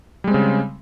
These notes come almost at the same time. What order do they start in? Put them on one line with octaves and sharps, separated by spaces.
G3 G#3 C4 C#3